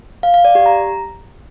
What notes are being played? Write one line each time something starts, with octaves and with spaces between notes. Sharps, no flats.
F5
F5
D5
G4
A#5